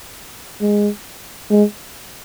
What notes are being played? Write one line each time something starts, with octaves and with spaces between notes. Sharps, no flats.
G#3
G#3